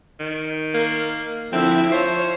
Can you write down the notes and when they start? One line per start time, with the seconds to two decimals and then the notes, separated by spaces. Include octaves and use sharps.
0.20 D#3
0.74 A#3
1.52 D3 F3 C4 E4 E5
1.92 F3 C5 C#5